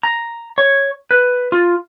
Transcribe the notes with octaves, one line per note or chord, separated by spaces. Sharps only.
A#5
C#5
B4
F4